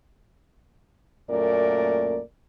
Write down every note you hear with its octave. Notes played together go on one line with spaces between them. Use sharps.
F#2 A#2 A3 A#3 A#4 D5